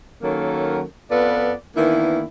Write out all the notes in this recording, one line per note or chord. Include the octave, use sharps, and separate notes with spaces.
D#3 F#3 A#3 C#4 A4 A#4
F2 B3 F4 A4 B4 D5
D#3 E3 A#3 B3 D4 E4